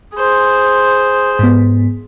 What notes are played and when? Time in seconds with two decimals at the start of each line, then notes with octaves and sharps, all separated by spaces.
0.16 G#4 C5
1.39 G#2 B3